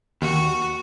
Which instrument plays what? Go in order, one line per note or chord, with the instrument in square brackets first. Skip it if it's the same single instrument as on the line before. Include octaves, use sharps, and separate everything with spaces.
[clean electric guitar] D#2 [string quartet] F#4